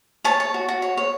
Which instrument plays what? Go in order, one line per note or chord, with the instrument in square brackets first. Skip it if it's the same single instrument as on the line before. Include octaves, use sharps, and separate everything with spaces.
[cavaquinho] C#5 A5
C#5
F#4
F#4
C#5
C#5